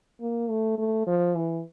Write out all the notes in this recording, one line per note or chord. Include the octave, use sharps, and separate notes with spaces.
A#3
A3
A3
F3
E3